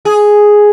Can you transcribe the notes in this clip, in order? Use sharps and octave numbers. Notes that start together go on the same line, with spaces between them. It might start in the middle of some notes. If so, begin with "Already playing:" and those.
G#4